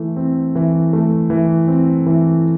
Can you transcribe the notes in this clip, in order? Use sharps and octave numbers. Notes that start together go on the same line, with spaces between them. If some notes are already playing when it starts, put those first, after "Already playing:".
Already playing: E3 A3
C4
E3
A3
E3
C4
E3